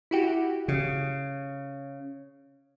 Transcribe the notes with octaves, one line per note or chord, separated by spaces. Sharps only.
E4 F#4 G4
C#3